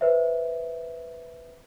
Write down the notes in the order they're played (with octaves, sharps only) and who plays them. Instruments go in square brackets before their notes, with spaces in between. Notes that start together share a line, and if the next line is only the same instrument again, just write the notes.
[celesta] B4 C5 E5